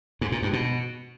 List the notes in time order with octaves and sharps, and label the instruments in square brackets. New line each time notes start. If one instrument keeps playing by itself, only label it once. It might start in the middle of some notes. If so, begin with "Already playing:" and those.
[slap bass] G#2
A#2
G2
B2